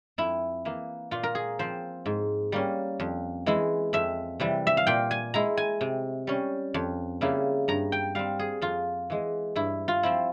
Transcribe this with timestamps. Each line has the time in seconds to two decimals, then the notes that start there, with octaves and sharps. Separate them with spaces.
0.18 F2 E4
0.65 E3 A#3
1.11 A#2 F4
1.23 A#4
1.35 G#4
1.59 F3 C4 C5
2.06 G#2
2.52 G3 A#3 C#4
3.00 F2
3.46 E3 G#3 E4
3.93 F2 E5
4.40 C3 E3 G3
4.67 E5
4.77 F5
4.87 A#2 G5
5.11 G#5
5.34 G#3 E4 A#5
5.57 G#5
5.81 C3
6.27 G3 C#4
6.74 F2
7.21 C#3 G3 A#3 E4
7.68 G2 A#5
7.92 G5
8.15 G3 C4 F5
8.39 G#4
8.62 F2 F4
9.10 E3 G#3
9.56 G2 E4
9.88 F4
10.03 F3 C4 E4